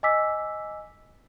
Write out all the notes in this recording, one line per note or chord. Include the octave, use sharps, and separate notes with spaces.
D#5 G#5 D6 E6 B6